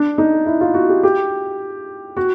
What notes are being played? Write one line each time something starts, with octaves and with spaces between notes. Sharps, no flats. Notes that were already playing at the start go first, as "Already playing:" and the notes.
Already playing: D4
D#4
E4
F4
F#4
G4
G4
F#4